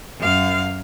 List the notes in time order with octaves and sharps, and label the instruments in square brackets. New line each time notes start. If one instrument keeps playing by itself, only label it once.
[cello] F#2 F5